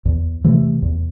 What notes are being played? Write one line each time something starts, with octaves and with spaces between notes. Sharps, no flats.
E2
C3 E3 A3
E2